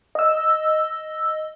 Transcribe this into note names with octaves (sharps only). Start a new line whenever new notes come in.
D#5 E6